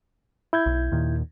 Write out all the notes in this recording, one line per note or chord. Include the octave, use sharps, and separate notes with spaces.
E4 G6 G#6
B1
D#2 A#2 D#3